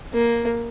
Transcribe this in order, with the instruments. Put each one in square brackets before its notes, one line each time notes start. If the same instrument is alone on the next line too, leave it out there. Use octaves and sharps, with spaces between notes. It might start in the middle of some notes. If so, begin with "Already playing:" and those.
[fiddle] A#3